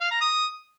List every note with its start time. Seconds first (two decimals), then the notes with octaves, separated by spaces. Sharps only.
0.01 F5
0.11 A#5
0.21 D#6